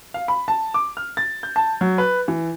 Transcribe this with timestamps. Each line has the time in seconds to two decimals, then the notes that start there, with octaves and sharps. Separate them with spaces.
0.14 F5
0.28 B5
0.48 A5
0.74 D6
0.97 F6
1.17 A6
1.43 G6
1.56 A5
1.81 F#3
1.98 B4
2.28 E3